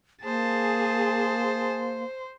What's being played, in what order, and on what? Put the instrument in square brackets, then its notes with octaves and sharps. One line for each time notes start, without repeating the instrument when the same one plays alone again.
[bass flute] A#3 [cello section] G#4 [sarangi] C5 [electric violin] A5